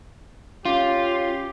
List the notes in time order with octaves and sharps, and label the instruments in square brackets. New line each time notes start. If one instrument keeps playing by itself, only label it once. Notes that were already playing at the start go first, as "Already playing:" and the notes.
[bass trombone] C#4 [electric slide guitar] F4 [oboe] G4